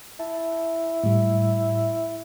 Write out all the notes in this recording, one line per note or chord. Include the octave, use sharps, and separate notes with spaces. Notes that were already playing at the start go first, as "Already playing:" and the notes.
E4 A5
A2 G3